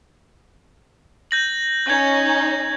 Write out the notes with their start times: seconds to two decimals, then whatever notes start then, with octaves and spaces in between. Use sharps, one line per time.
1.31 G6 A#6 F#7
1.86 C#4 D#4 G6 G#6